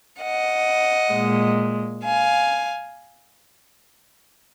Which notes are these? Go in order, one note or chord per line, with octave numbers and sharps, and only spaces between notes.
D#5 F#5
A#2 G#3
F5 G#5